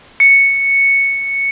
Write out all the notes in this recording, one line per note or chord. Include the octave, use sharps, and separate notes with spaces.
C#7